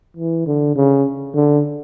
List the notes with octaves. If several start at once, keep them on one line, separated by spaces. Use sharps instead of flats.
E3
D3
C#3
D3